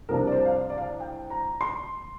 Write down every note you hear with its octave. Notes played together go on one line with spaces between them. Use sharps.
C2 C3 F3 D4 A#4
D5
C5
F5
D5
D5
F5
G5
A#5
C6